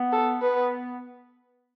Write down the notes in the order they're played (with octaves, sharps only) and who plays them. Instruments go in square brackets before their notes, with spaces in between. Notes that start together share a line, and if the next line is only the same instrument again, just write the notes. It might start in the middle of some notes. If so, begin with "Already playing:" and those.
Already playing: [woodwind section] B3
[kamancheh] A4
[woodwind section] B3 [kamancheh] B4